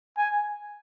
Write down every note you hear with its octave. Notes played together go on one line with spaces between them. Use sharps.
G#5